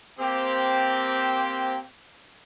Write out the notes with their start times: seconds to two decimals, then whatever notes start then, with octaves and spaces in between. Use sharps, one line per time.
0.19 A#3 C4 G4